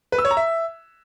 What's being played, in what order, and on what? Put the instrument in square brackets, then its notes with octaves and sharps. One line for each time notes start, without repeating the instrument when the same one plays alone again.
[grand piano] B4
E6
C#5
A#5
E5